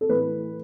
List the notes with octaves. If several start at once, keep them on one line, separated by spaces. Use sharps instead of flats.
A4
A2 E3 B4